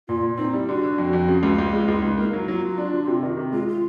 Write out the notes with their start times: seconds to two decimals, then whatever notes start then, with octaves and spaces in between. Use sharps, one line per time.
0.08 A#2 F4
0.23 A#2
0.38 C4 D#4
0.53 G3 E4
0.68 D3 F#4
0.83 D3
0.98 F2
1.13 F2
1.28 C#3
1.43 C#2
1.58 C#2
1.73 G#3 F4
1.88 C#2 E4
2.02 C#2 D#4
2.17 A#3 E4
2.29 D#4
2.33 F#3
2.40 E4
2.48 F#3 F4
2.62 F#3
2.78 D4
2.93 D3
3.07 C3
3.23 D#3
3.37 C3
3.52 G#3 F4
3.68 F4